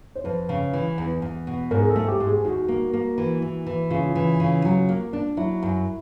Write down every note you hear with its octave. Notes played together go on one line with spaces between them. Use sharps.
C5
F2 B4
C#3
E3
E2
E2
B2
G#2 A#4
G#4
A4
A3
G4
G#2
G#4
D#2 F#4
A#3
A#3
E3
E3
E3
C#3 F4
E3
C#3
F#3
A#3
D4
F#3 E4
F#2